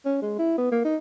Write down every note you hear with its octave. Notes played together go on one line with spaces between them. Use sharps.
C#4
G#3
E4
B3
A#3
D#4